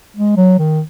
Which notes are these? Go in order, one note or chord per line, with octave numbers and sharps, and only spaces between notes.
G#3
F#3
D#3